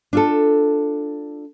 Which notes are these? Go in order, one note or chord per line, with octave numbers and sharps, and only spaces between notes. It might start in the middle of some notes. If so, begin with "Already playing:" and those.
D4 F4 A4